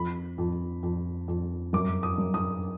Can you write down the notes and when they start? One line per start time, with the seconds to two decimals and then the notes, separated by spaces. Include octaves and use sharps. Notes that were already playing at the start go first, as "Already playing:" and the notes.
Already playing: F2 B5
0.38 F2
0.83 F2
1.28 F2
1.73 F#2 D6
2.03 D#6
2.18 F#2
2.34 D#6